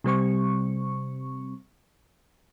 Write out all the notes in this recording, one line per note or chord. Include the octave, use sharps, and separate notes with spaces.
C3 G3 C4 C#6